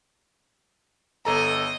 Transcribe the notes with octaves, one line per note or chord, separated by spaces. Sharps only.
G1 A4 D#5 A#5